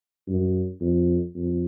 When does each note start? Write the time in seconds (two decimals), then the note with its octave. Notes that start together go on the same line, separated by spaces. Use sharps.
0.28 F#2
0.81 F2
1.35 F2